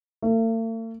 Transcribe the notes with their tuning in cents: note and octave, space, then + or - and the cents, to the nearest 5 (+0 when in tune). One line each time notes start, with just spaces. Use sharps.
A3 +45